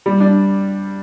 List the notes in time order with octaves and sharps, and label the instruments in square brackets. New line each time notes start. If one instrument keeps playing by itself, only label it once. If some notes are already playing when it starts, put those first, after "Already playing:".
[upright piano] G3
D4